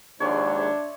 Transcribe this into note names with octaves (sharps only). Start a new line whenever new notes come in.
A#1 D#2 G#2 D4 C#5 D5 C6
E5